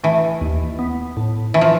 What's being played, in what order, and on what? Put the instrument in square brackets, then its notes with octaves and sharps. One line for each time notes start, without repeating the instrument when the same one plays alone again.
[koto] E3 [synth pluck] A3
[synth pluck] D#2
B3
A2
[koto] E3 [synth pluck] A3
[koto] F3